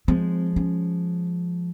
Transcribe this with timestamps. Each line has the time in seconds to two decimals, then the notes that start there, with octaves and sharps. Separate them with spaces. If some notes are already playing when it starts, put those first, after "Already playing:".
0.08 F3 G#3 C4
0.56 C#4